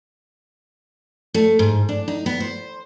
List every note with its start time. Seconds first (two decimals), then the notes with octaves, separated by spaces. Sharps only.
1.34 A3
1.59 G#2
1.89 D4
2.08 D#4
2.26 B3
2.40 C5